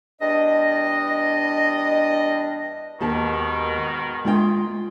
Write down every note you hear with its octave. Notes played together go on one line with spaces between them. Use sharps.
E2 G3 D4 D#5
D#2 G#2 B2 D#3 G4 A5
G#3 F4 G5